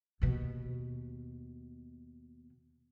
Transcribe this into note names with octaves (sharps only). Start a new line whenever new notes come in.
D#2 B2